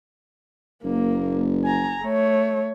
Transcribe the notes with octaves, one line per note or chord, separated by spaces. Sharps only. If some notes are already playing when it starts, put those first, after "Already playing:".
F#1 A#3
G#5 A#5
A3 C#5